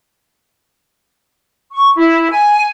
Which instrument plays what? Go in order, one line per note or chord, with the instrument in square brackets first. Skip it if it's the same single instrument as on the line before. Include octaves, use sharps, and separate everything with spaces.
[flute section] C#6
E4
G#5